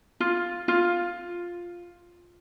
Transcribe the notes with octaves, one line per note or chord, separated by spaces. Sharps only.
F4
F4